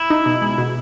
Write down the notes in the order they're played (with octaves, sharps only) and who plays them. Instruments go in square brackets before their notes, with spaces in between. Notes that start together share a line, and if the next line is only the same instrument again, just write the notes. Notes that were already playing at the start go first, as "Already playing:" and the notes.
Already playing: [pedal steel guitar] E4
[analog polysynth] D#4
B2
G#3
B2